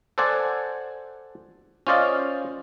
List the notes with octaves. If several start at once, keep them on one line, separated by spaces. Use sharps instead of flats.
A4 C5 D5 F#5 G#5
C#4 F4 C5 D5 D#5 F5